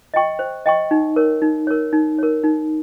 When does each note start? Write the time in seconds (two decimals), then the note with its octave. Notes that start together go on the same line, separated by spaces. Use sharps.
0.14 D#5 G5 C#6
0.39 C5
0.66 D#5 G5 C#6
0.91 D#4
1.16 A#4 C#5
1.42 D#4
1.67 A#4 C#5
1.93 D#4
2.18 A#4 C#5
2.44 D#4